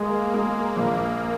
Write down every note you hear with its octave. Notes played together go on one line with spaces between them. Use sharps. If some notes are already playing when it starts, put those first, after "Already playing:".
Already playing: G#3 A#3
G#3
A#1